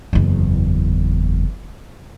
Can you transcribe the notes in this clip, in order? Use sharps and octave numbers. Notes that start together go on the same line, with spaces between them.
F#1 E2